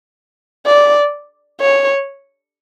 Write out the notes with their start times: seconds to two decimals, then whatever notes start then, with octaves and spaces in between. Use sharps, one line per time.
0.66 D5
1.61 C#5